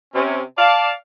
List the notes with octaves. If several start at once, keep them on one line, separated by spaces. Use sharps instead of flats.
C3 C#4
D5 F5 A5